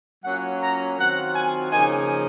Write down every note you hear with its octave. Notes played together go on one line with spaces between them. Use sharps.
F#3 A#3 C#4 F4 F#5
A#5
D#3 F#3 C4 F4 F#5
G#5
C#3 F3 A#3 D#4 G#5